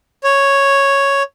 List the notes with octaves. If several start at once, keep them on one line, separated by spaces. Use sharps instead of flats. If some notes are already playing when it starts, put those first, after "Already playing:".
C#5